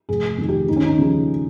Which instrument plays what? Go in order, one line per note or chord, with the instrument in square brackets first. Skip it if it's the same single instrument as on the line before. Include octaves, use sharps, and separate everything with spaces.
[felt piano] F1 G#4
F2 D#3
G4
D#2 D#4
C#4
D#4
C#3 F3